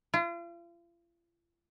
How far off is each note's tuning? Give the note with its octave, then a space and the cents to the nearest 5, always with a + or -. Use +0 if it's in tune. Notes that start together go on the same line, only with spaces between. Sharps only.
F4 -40